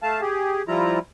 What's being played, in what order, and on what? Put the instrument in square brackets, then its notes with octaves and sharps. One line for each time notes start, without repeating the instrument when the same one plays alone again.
[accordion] A3 F5 A5
G4 G#4
F3 G3 E4 F4 A#5